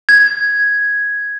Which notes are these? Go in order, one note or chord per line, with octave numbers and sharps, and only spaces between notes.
G#6